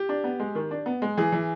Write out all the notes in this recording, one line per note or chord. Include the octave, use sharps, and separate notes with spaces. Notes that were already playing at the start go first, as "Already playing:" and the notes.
Already playing: G4
D4
B3
G#3
D#3
D4
B3
G#3
E3 G#4
E3